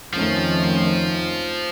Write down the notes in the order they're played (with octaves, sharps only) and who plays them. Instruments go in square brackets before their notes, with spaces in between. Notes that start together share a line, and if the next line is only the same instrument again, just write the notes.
[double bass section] F2 D#3 A3 C#4 [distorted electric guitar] F3